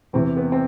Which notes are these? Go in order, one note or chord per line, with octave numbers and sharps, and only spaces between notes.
E2 C3 E3 C4
B3
C4